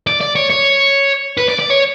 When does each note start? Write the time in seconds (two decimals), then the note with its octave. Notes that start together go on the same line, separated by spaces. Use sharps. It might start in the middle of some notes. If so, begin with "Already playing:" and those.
0.07 D5
0.21 D5
0.36 C#5
0.50 C#5
1.38 B4
1.49 D5
1.59 D5
1.70 C#5